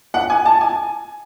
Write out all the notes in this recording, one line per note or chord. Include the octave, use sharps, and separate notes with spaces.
F#5
G#5
A5
G#5